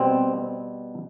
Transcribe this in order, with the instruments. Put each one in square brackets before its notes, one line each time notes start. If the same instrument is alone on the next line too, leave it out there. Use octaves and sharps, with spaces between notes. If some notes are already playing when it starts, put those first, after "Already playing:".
Already playing: [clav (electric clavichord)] B2 G3 C4